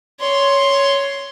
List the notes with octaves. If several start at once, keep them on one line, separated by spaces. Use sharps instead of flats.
C#5 C6